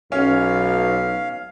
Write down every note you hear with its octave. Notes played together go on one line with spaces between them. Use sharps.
B1 C#4 F5